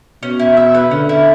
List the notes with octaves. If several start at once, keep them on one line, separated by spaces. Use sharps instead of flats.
B2 C#4
E4
E5
B4
D3 C#4
E4